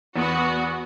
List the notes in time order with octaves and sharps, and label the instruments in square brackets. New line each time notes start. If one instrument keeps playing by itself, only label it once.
[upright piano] E2 [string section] B3 F#4